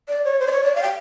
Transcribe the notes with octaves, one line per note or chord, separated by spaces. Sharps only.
D5
C#5
C5
D5
C#5
D5
F5
G5